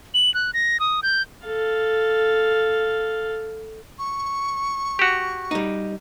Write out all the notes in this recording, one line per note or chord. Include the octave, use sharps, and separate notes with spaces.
F#7
F#6
A#6
D#6
G6
A4 F5
C#6
F#4 G4
G3 D#4